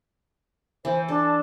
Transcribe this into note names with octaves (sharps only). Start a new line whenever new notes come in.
E3 C5
D4 A4